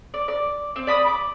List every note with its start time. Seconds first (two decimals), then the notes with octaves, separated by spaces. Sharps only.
0.14 D5
0.28 D5
0.76 C4
0.87 D5 B5 D#6
1.06 B5 D6